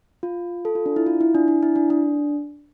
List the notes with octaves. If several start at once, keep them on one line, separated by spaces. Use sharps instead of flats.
F4
A4
F4
D4
E4
F4
E4
D4
D4
E4
D4
D4